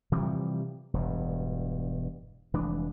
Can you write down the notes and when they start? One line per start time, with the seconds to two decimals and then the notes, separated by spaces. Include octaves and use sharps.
0.12 C3 E3 F3 G3
0.94 E1 G2
2.54 F1 E3 G#3 D4